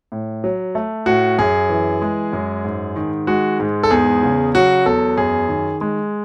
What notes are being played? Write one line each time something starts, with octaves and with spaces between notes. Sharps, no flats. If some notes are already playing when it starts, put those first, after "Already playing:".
A2
F#3
A3
A2 F#4
F#2 G#4
E3
G#3
F#2
G#2
D#3
G#3 F#4
G#2
A4
E2 G#4
C#3
F#3 F#4
E2 A4
F#2 G#4
D#3
G#3